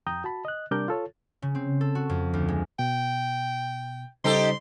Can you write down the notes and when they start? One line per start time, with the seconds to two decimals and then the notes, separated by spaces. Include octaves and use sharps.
0.07 F2 G5 A#5 D#6 G6
0.24 F#4 A5 B5
0.45 D#5 F#6
0.71 C3 G3 D4 A#4 D6 G6
0.88 F4 A4 C#5
1.42 C#3
1.55 C4
1.81 A4
1.95 F#4
2.09 F2
2.33 D2
2.48 G#3
2.79 B2 G5
4.24 C#3 G3 D#4 G4 A4 C5 C6